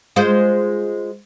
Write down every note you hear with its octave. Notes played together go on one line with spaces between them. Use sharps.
G#3 F4 C5